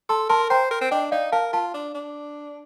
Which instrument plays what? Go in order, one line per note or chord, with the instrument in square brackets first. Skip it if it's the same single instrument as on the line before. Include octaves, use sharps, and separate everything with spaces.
[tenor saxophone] A4 [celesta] A5 C6
[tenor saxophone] A#4 [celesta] A5 C6
[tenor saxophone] C5 [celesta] G5 A#5
[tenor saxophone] A#4
C4
[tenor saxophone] D4 [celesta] D#5 G5
[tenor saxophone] D#4 [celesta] D5 F5
[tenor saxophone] A#4 [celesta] F5 A5
[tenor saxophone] F4 [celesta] F5 A5
[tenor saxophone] D4
D4